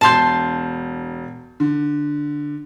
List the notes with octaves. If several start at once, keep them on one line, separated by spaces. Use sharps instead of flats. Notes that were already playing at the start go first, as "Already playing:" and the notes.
E1 A5 C6 G6
D3